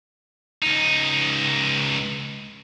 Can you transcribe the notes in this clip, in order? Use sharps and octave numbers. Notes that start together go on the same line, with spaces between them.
C#2 D#4